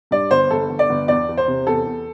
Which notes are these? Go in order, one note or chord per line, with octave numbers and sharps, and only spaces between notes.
G2 D5
G1 C5
G1 A4
G1
D5
G1
E2 D5
E2
C5
C3
E2 A4
E2